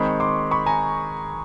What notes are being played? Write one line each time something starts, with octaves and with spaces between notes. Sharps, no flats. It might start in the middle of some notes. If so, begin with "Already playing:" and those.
Already playing: D#3 G#3 C4 B5 C#6
C6 D6
B5 C#6
G#5 A#5